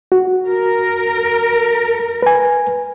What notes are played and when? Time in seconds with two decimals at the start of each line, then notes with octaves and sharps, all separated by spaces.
0.12 F#4
0.46 A#4
2.22 B4 G#5